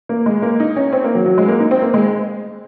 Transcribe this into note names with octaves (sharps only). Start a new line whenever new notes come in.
A#3
G#3
A#3
D#4
C#4
C4
A#3
F#3
F#3
G#3
A#3
D#4
C4
A#3
G#3